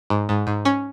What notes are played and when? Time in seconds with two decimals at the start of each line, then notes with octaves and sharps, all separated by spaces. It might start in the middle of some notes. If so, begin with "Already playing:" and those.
0.10 G#2
0.29 G#2
0.47 G#2
0.65 C#4